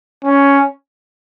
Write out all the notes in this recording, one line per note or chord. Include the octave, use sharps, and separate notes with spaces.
C#4